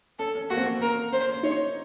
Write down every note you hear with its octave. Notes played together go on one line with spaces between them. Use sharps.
C#4 A4
C#4
A#3 F#4
C4
A#3
A#4
C#4 C5
C#4
D#4 C#5